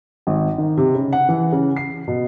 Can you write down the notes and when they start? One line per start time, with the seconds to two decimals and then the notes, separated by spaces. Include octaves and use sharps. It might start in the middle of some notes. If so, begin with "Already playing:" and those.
0.27 G#1
0.58 D#3
0.77 C3
0.95 C#3
1.13 F#5
1.29 E3
1.52 C#3
1.77 C7
2.08 B2